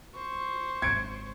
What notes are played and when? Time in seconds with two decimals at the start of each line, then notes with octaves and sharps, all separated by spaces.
0.16 C5 C#6
0.82 G#1 C#3 G#6 C#7 D7